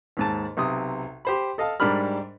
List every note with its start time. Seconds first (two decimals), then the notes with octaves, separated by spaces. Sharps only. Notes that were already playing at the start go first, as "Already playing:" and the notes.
0.17 D#2 G#2 A5
0.57 B1 C3 D#6
1.25 G4 C5 B5
1.58 A4 D#5 F5 A5
1.80 G#2 G3 D4 A#4 B5 F6